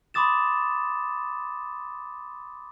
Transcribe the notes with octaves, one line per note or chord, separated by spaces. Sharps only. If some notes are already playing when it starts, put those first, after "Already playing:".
B5 C6 D6 D#6 A6 E7